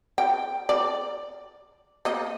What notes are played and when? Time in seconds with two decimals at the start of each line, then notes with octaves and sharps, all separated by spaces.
0.18 G5
0.69 D5
2.05 A#3 D#5